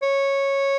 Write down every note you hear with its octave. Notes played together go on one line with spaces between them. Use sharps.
C#5